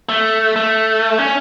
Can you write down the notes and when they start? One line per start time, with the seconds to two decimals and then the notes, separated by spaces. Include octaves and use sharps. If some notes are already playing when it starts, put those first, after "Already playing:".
0.09 A3
0.56 A3
1.18 C#4